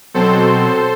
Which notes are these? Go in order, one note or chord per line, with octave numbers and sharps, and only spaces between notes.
B2 F#3 C4 A4 C5